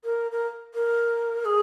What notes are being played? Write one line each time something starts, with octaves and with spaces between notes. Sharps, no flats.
A#4
A#4
A#4
G#4